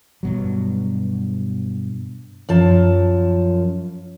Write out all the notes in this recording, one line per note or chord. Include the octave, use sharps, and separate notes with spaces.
G2 B2 F#3
F#2 F3 A5